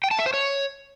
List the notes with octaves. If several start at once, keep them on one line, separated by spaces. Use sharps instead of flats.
G5
A5
E5
C5
C#5